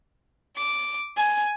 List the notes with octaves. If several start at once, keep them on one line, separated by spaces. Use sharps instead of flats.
D6
G#5